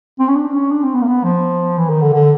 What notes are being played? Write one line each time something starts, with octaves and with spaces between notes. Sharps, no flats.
C4
C#4
D4
D4
C#4
D4
C4
B3
A#3
B3
F3
E3
D#3
D3
D3